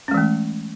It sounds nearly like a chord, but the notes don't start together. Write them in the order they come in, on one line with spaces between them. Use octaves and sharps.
C#4 G#3 E3 A3